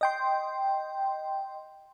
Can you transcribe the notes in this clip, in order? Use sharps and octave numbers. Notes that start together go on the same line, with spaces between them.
D#5 G5 C6